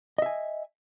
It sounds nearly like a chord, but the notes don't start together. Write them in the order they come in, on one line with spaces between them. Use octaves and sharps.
D#5 E5 G#5